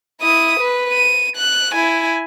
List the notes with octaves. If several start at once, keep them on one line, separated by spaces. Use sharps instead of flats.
E4 D#6
B4
D#7
F#6
E4 G#5